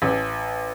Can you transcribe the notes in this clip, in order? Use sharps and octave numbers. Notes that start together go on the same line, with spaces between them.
A1